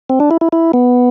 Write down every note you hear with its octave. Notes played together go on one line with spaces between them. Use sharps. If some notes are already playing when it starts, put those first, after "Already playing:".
C4
D4
E4
E4
E4
B3